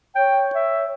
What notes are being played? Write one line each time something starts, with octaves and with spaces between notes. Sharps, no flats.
C#5 G5
E5